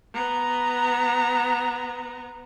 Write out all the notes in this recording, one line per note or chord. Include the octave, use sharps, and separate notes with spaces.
B3 A#5